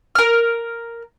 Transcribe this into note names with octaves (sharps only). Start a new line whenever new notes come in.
A#4 F6